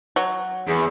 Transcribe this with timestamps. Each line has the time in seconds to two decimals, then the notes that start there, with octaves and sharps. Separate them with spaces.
0.16 F#3
0.67 E2 G#4